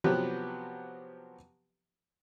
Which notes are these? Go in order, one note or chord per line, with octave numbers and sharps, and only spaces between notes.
C3 F3 F#3 B3 G4 B4